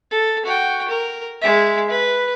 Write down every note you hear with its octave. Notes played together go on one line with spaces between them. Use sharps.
A4
F#4 G5
A#4
G#3 E5
B4